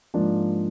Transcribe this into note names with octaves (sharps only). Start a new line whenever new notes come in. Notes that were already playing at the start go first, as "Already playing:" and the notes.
G#2 F3 A#3 D4